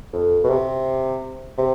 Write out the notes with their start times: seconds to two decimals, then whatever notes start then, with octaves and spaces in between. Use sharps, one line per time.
0.13 F2
0.44 B2
0.50 C3
1.58 C3